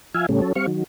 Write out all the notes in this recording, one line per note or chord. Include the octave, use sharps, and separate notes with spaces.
F3 E5 F5 G#5
A2 C#3 G3 A3 C#4
F#3 C#4 A4
G3 C4 F5 C#6
D#3 F#3